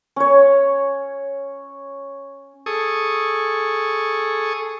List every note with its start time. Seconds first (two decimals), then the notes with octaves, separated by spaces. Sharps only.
0.16 C#4 C#5
2.66 G#4 A4 C#6 D#6